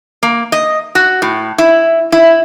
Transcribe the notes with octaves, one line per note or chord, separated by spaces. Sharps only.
A#3
D#5
F#4
A2
E4
E4